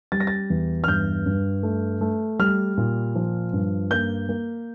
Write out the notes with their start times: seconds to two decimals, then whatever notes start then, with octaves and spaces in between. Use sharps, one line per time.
0.12 G3 A6
0.20 A#6
0.27 A6
0.50 E2
0.84 F6
0.87 G2 G6
1.26 G2
1.63 A3
2.01 A3
2.39 G3 F6
2.77 A#2
3.15 F3
3.53 G2
3.91 A#3 G6
4.29 A#3